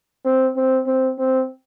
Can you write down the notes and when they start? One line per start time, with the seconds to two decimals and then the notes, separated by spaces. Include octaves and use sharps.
0.25 C4
0.56 C4
0.87 C4
1.18 C4